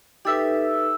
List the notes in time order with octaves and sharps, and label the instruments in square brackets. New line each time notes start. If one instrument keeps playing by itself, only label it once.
[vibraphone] D#4 A4 B4 [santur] G4 E5